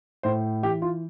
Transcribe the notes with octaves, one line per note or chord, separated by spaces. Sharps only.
A2 C5
E3 G4
F4